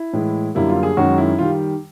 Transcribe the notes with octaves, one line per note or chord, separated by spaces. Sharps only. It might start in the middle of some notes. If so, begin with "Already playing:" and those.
Already playing: E4
A2 E3 G#3
F#2 D3 G3 A#3 E4
F4
G#4
F#2 D#3 G#3 C#4 F#4
E4
D#3 G3 F4